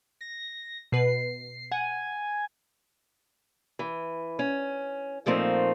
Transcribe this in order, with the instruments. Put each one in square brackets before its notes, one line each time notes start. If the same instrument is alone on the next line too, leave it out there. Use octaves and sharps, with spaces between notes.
[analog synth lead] A#6
[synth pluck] B2 B4 [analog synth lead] C7
[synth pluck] F#5 [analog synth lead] G#5
[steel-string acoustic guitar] E3
C#4
A#2 F3 A3 A#3 C4 D#4